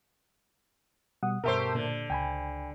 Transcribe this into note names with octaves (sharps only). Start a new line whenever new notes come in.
B2 G3 F#5 D#6
G2 B2 A3 G4 A#4 C5 E5 C6
A#2 D3
C#2 G5 G#5 B5